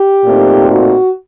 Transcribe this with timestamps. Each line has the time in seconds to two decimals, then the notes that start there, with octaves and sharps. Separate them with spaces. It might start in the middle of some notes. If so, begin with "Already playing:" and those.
Already playing: G4
0.25 A#2 A3 C4 D#4
0.70 F#4